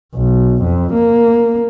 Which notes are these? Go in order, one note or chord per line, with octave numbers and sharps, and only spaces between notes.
B1
F2
A#3